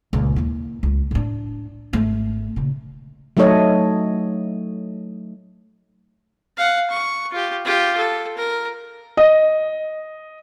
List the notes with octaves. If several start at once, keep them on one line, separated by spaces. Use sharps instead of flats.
C#2 A#2
D#2 E4
C#2
A2 D4
G#1 A3
A#2 C#3
F#3 A3 D#4 A4 C#5 D#5
F5 F#5
C#6
F4 G4
F4 G4
A4
A#4
D#5